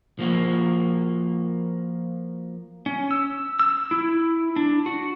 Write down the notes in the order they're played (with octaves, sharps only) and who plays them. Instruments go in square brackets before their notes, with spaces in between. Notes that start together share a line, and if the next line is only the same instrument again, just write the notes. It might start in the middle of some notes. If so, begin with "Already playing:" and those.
[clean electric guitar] F3 A#3 F#4
[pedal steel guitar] C#4
E6
E6
E4
D4
F#4